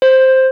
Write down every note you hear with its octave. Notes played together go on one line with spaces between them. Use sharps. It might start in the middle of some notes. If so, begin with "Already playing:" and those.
C5